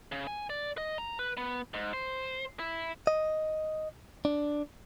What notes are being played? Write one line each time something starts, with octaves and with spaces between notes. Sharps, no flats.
C#3
G#5
D5
D#5
A#5
B4
B3
G#2
C5
E4
D#5
D4